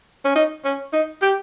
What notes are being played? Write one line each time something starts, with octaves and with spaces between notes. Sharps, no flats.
C#4
D#4
C#4
D#4
G4